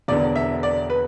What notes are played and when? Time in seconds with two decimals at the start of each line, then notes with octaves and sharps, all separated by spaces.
0.08 E1 E2 D3 B3 D5
0.36 E5
0.63 D5
0.90 B4